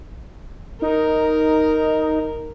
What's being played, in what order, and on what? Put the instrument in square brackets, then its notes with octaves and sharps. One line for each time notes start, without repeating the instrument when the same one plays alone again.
[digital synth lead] D#4 [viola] A#4